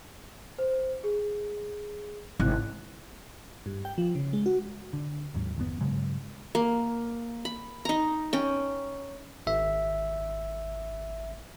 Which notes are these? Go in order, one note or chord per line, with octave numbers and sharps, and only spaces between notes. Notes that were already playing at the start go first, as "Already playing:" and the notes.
C5
G#4
G#1 E4 F#6
G2
G5
F3
C#3
G#3
F#4
D3
D#2 G#2 F#3
G1 E2 C#3 B3
G2 C#3 F#3 G#3
A#3
B5
D#4 A#5
C#4 G5
G#1 E5